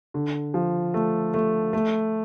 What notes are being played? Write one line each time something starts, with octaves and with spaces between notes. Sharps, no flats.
D3
F3
A3
A3
A3